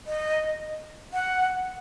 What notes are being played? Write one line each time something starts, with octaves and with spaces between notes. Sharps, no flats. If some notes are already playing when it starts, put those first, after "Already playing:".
D#5
F#5